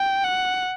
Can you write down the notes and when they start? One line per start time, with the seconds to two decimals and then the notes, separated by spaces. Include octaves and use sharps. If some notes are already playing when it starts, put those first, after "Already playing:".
Already playing: G5
0.24 F#5